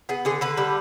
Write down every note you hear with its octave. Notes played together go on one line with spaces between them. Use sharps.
B3 G#4
D3 G#4
D3 B4
G3